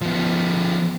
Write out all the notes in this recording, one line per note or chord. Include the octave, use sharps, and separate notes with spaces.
F3 B3